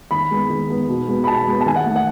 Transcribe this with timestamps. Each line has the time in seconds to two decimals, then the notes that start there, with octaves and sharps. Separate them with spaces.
0.11 D#3 B5
0.31 G#3 B3
0.50 D#3
0.70 G#3 B3
0.89 B2
1.08 G#3 B3
1.24 B5
1.27 B2 A5
1.48 G#3 B3
1.61 A5
1.66 D#3 G#5
1.76 F#5
1.86 A3
1.96 F#5